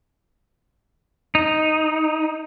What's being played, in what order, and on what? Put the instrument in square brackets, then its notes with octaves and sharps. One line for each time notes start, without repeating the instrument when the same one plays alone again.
[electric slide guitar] D#4